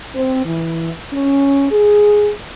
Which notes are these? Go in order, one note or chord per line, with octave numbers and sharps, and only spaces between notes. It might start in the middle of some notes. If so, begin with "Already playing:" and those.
C4
E3
C#4
G#4